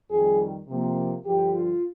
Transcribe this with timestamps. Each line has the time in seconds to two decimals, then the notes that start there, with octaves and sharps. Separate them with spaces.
0.10 F2 D#3 G3 G#4
0.68 C3 F3 A#3
1.25 G2 D3 F3 G4
1.54 F4